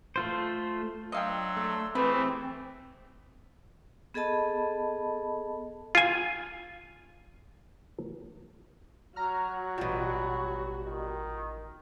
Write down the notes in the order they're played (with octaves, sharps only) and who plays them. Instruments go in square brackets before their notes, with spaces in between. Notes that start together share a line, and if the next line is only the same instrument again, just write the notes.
[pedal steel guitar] A3 F4 C5
[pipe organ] F#3 [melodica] D4 C6 E6 [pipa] D#5 F5 G5
[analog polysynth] A3
[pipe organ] E3 A3 [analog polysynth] C4 [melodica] E4 G4 G#4 [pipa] B4
[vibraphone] B3 G#4 A4 D#5 A5 B5
[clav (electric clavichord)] F4 G#5
[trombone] F#3 [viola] F#4 [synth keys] A#5 F6
[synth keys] A1 F4 [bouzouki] B2 G3
[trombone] D#3